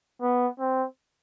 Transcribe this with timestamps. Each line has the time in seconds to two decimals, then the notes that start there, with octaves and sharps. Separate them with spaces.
0.22 B3
0.59 C4